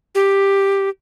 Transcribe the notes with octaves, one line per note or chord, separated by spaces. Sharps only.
G4